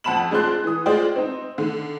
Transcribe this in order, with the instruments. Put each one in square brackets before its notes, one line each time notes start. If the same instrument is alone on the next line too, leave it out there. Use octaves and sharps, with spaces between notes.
[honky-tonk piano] F2 F#5 A5 B5 E7 F#7
G#3 D4 F4 C5 C6 F#6
E3 D#6
G#3 F4 C5 D5 G5
C4 D#4
D3 D#3